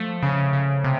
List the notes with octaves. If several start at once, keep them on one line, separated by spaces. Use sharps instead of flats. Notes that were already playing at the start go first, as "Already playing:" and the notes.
Already playing: F3 A3
C#3
C#3
C3